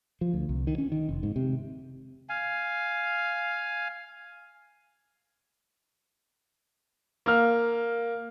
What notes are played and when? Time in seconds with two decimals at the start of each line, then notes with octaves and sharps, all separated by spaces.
0.21 F3
0.33 D2
0.49 C2
0.67 D#3
0.78 C#4
0.92 D#3
1.09 F1
1.23 G#2
1.36 C3
2.29 F5 G#5
7.26 A#3 F6